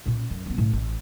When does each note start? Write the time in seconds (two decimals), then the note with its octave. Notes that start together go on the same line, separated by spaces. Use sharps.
0.06 A#2 C#4
0.30 F#2
0.46 F#1 B3
0.58 A2 C#3
0.73 A1